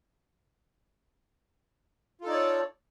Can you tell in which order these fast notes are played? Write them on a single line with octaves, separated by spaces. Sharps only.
F4 A4 D#4 D5 C#5